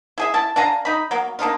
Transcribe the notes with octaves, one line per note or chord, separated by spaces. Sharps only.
E4 G#4 E5
E4 A5
D4 F5 G#5 A#5
D#4 B5
F#3 A#3 B3
A#3 D4 D#4 F4